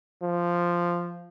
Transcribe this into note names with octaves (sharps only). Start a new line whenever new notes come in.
F3